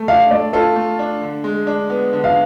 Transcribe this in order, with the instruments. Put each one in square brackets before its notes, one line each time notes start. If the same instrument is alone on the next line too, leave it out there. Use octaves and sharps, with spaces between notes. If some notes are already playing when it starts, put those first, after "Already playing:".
Already playing: [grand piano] A3
[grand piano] D4 [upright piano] F5
[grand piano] A3 [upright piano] D5
[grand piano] F4 [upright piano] A4
[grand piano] A3
D4
D3
G#3
D4
B3
D3
[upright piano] F5